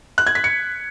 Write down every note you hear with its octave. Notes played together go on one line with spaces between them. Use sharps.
F#6
G#6
B6
C#7